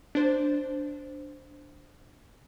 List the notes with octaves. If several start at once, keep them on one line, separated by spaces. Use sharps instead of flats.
D4 C5